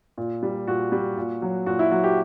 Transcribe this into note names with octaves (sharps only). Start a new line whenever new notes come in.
A#2
G3
A#2 F#4
G3
A#2
F#3
A#2 F#4
E4
F#3 F#4
G4